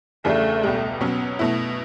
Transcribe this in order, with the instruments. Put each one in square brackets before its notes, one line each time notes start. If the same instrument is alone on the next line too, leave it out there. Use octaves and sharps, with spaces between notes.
[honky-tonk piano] E2 C#3 G3 D4 [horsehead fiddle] A3
[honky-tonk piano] C#2 B2 G3
[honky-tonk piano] B2 F#3 C#4 [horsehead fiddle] B3
[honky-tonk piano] B2 A3 E4